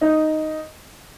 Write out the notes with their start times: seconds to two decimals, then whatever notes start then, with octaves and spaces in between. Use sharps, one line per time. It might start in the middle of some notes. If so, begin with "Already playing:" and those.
0.01 D#4